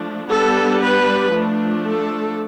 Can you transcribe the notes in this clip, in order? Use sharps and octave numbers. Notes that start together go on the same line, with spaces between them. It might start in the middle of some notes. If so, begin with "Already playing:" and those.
Already playing: F3 A3 D4
G3 B3 D4 A4
B4
F3 A3 D4
A4